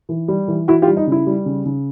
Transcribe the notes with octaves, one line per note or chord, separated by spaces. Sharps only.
E3
G3
E3
E3 E4 F#4
F4 G4
G3
D#4
C#3 E4
G3
C#3
C#3